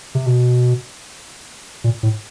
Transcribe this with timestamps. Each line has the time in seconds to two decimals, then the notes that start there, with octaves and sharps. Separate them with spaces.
0.15 C3
0.26 B2
1.84 A#2
2.03 A2